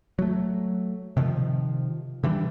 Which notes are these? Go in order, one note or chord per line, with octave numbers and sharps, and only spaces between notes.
F#3 A3
C3 D#3 F3
D3 E3 G3 D4